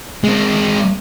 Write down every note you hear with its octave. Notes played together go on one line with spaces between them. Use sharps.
G#3 C4